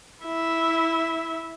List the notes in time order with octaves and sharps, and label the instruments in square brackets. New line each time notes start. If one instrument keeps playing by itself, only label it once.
[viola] E4 E5